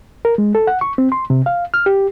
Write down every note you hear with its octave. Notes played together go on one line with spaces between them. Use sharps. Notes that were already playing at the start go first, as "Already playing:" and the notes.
A#4
G#3
A4
F#5
C#6
C4
C6
C3
F5
F6
G4